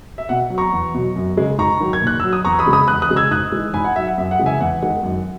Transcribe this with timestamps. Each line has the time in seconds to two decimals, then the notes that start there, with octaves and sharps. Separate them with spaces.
0.18 E5
0.29 B2 F#5
0.50 F#3
0.58 A#5 C#6
0.72 E2
0.94 B2 F#3
1.16 F#2
1.37 C#3 G#3
1.58 G#2 A#5 C#6
1.80 D#3 F#3
1.93 G#6
2.02 A#2
2.07 F#6
2.20 F#3 E6
2.33 D#6
2.44 E2 A#5 C#6
2.59 B5 D#6
2.66 C#3 G#3
2.73 B5 D#6
2.88 E2 D#6 F#6
3.02 D#6 F#6
3.10 C#3 G#3
3.16 E6 G#6
3.31 G#2 D#6 F#6
3.52 E3 G#3
3.74 G#2 G#5 B5
3.84 F#5
3.96 F#3 E5
4.07 F#5
4.18 F#2 E5
4.31 F#5
4.39 C#3 E3 G#3
4.46 E5 G#5
4.60 E2 F#5
4.82 D#3 G#3 F#5
5.03 F#2